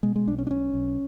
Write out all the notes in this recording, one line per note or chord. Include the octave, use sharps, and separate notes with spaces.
B2 G#3
G#3
B1 D4
C#4
D4
B1 C#4
B1